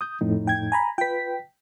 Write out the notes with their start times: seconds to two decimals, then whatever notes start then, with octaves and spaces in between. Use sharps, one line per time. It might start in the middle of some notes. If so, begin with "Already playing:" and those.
0.01 D#6 G6
0.21 F2 A2 D#4
0.47 G5 G#6
0.72 G#5 A#5 B5
0.98 F4 B4 G5 B6